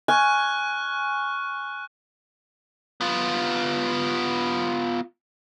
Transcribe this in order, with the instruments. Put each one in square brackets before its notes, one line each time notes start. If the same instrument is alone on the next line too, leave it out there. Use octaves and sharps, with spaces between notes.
[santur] G#5 [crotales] C#6 F6 F#6
[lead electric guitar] B3 F4